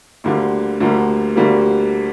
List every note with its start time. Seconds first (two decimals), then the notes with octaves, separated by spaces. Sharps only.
0.24 D2 D3 G3 A#3
0.80 D2 D3 G3 A#3
1.36 D2 D3 G3 A#3